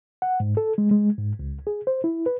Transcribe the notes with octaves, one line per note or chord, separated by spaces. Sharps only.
F#5
G#2
A4
G#3
G#3
G#2
C#2
G#4
C5
E4
B4